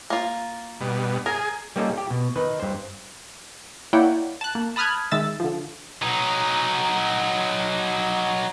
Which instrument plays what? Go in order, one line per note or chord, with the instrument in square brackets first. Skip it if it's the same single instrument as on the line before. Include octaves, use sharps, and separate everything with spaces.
[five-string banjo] A#3 F4
[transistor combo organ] G2 B2
[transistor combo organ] G#4 [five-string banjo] A#4
[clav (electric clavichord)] G3 A#3 C#4 D#4 F4 A4
G4
B2
D#3 D#4 B4
G2 C5
[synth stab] A#3 E4 C#5 D5 F#5 G5
A5 F#6
A#3
A5 B5 D#6 F6 F#6 G#6
D#3 G#3 E5 E6 A6
D3 F3
[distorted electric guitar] F#3 D#4